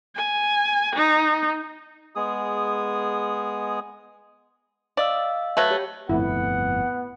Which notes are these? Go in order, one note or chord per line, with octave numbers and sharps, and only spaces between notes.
G#5
D#4
G#3 B3 G#4 D#6
D5 D#5 F5 E6
F#3 A3 B4
G4 C#5
G1 F2 A2 B3 E4 F#5